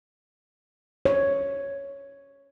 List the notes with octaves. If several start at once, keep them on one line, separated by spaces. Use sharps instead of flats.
C#5